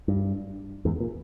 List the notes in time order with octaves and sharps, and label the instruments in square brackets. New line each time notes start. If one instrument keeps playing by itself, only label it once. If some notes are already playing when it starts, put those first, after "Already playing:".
[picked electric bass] G2
E2 G#2
A#2